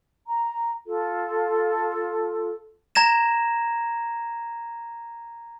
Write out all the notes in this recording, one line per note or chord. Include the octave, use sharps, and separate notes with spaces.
A#5
F4 A4
A#5 G#6 A#6 E7